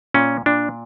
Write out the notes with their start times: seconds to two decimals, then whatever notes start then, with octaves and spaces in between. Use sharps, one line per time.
0.14 A#2 C#4
0.46 A#2 D4